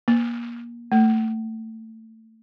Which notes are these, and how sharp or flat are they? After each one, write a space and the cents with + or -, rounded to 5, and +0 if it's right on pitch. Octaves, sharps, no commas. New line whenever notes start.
A#3 +25
A3 +20